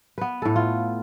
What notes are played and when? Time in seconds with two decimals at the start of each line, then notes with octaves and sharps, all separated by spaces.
0.18 B3 B4
0.42 A2 A4
0.56 F4